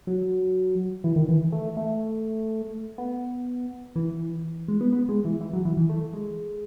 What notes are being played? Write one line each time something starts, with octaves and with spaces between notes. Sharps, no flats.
F#3
E3
D#3
E3
A3
A3
B3
E3
G#3
B3
B3
G#3
E3
E3
F#3
E3
E3
A3
G#3